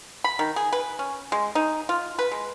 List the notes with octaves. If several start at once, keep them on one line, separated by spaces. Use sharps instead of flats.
B5
D#3
G#4
B4
C#4
G#3
D#4
F4
B4
G#3